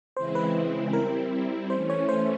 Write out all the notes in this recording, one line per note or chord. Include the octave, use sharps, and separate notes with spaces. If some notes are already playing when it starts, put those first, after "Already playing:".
C#3 E3 G#3 C4 E4 C5
B4
G3 C4 E4 A#4
E3 A3 C#4 C5
C#5
C5